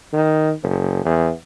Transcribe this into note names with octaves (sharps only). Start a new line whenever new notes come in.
D#3
F#1
E2